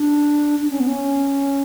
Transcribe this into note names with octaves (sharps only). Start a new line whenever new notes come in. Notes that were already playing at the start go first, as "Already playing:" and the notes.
Already playing: D4
D4
C#4
B3
C#4